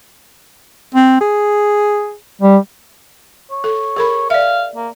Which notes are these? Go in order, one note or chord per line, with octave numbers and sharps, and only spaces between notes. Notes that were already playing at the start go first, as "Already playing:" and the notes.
C4
G#4
G3
C#5
A4
G#4 A#4 B5
D5 E5 F5
A#3